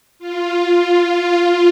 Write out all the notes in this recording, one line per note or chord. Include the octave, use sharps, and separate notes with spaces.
F4
F4
F4